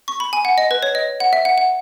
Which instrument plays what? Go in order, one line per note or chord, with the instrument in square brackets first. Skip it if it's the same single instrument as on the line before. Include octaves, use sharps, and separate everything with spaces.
[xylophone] C#6
B5
G#5
F#5
D#5
B4
C#5
D#5
F#5
E5
F#5
F#5